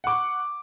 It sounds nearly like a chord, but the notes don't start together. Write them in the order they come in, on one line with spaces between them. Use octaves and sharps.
F#5 D6 C#6